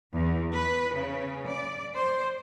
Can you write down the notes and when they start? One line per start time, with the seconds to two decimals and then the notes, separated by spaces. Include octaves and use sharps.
0.15 E2
0.54 B4
0.95 C#3
1.48 D5
1.94 C5